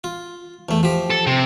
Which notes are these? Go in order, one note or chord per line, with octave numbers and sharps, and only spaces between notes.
F4
E2 A3
F3 G4
A4
C3